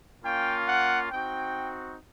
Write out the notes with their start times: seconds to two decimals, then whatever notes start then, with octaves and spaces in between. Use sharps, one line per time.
0.25 A#3 C#4 F4 G5
0.68 F#5
1.11 C4 D#4 F#4 G5